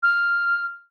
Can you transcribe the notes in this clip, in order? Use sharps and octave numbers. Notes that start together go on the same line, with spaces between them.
F6